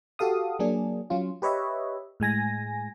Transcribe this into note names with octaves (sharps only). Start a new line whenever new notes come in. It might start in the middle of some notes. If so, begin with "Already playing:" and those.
F#4 G4 A4 F5 D#6
F#3 A#3 D4 G#4
F#3 C#4 F4
G4 B4 C#5 D#5 E5
A2 G#3 G#5 A#6